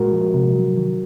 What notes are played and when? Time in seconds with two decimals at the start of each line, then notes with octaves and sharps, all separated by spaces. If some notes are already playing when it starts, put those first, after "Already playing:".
Already playing: A#2 G#3 F#4 A#4
0.12 F3
0.34 C3
0.55 F#3
0.78 D#3